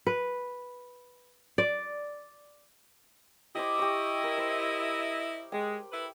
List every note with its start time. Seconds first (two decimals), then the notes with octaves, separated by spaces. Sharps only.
0.07 B4
1.58 D5
3.55 E4 G4 C5 D#5 D6
3.79 G4 C#6
4.24 A#4
4.38 C5
5.52 G#3 G5
5.92 E4 A4 B4